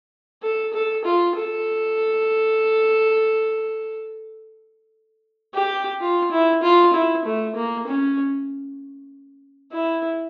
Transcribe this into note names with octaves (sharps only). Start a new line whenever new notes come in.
A4
A4
F4
A4
G4
F4
E4
F4
E4
A3
A#3
C#4
E4